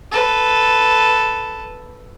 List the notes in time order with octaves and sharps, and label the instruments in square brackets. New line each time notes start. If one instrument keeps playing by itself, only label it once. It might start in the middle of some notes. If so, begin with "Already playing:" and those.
[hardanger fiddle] A4 B4